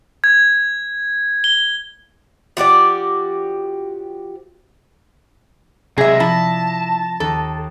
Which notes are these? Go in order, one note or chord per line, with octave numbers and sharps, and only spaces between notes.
G#6
G7
F3 F#4 G4 D5
C3 F#3 G#3 G#4 D5 E5 A#6
F3 E4 A5 B6
D#2 A4 D#6